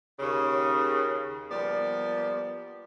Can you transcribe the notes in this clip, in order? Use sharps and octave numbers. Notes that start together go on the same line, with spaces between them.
D#2 C#3
F3 G3 A#3 B3 D5